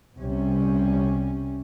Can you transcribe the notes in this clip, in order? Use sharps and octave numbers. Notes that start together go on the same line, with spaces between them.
C2 C3 G3 C#4